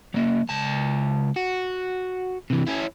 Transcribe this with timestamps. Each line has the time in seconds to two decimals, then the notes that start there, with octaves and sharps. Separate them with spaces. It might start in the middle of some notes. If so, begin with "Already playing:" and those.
0.15 F#3 A#3
0.50 C#2 A5
1.36 F#4
2.50 C3 E3
2.67 C#4 E4